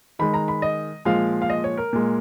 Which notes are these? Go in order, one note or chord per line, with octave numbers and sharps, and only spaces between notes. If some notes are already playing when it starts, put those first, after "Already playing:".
D#3 G#3 B5
A#5
B5
D#5
A#2 F3 G#3 F5
F5
D#5
C#5
A#4
A#2 G#3